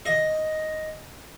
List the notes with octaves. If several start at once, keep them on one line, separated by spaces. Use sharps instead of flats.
D#5